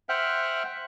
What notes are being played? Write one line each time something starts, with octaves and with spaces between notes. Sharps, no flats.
C5 E5 F#5 G5 F6 F#6